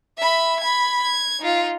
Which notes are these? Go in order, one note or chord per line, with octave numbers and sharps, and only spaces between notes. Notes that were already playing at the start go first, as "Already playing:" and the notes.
E5 B5
B5 G#6
G#6
D#4 F4